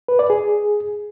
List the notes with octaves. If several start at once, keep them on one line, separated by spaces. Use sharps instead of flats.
B4
D5
G#4